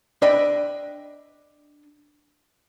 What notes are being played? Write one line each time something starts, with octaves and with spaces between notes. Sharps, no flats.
D4 D#5 E5 G5 B5